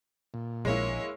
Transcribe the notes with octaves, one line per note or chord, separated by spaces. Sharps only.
A#2
A#1 G#3 A#3 E4 C#5